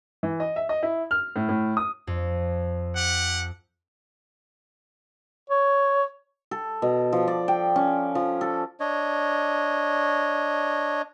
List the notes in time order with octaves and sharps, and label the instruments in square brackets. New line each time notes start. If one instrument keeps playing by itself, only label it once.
[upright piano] E3
D#5
E5
D#5
E4
F6
A2
A2
D#6
[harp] F2
[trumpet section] G4 F#5
[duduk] C#5
[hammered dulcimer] A4
B2
F3
D5
G5
C#4
F3
A4
[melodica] D4 C#5 D#5